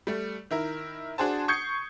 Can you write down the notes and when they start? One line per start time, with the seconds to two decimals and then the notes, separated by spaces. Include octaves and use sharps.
0.07 G3 A3
0.51 D#3 E4 A#4
1.18 D4 F#4 G#4 C5 A5
1.48 C#6 D#6 G6 G#6 C7 C#7